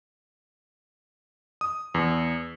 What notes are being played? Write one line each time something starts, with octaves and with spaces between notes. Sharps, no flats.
D#6
E2